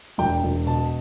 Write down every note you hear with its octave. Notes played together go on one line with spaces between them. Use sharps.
E1 G5
E1
B2 A5